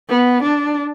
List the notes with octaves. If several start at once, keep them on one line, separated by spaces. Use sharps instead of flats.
B3
D4